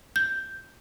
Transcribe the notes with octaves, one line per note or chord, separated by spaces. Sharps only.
G6